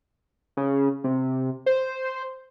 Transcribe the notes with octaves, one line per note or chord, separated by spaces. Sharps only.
C#3
C3
C5